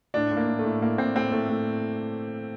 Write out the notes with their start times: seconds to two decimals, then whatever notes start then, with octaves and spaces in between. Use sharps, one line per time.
0.14 A2 D4
0.31 A2
0.37 A#3
0.47 A2
0.59 A3
0.65 A2
0.81 A2 A#3
0.98 A2 C4
1.16 A2 C4
1.32 A2 A3
1.49 A2